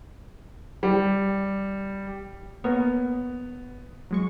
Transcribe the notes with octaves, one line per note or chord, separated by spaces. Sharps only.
G3
A#3 B3 A#4 C#5
F#3 G#3 C#6